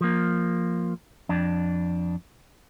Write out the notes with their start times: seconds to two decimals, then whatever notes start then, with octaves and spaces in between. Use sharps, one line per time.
0.01 F3 A#3
1.29 F2 D4